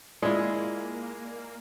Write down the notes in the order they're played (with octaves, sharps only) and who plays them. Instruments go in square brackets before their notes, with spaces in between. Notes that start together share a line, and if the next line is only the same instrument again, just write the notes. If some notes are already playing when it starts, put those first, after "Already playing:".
[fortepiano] G#3 E4 G#4 [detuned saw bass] A#3 [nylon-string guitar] F4 D5